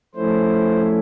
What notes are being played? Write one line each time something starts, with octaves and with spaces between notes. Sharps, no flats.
F3 A3 C#4 E4 C5